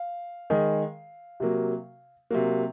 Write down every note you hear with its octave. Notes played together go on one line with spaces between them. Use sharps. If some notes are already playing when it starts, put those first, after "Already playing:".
Already playing: F5
D#3 G#3
C3 F#3 A#3
C3 F#3 A#3